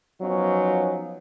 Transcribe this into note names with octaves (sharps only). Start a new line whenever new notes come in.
F3 F#3 B3 C#4 D#4 F4